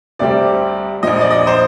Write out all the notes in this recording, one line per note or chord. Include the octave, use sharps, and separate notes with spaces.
D2 C3 G3 C4 D5
A#1 A#2 F3 D#5
D5
D#5
C5